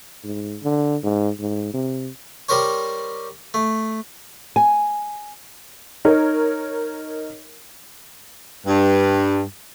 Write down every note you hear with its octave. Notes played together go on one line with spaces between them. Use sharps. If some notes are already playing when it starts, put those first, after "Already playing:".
G#2
D3
G#2
G#2
C3
G3 G4 A#4 C5 C#5
A3
G#5
D#4 A#4 C#5
G2